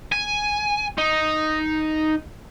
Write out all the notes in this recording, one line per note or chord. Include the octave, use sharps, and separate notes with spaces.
G#5
D#4